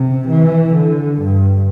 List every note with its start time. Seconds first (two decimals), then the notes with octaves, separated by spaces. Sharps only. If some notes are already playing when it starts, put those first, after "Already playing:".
Already playing: C3
0.28 E3
0.74 D3
1.19 G2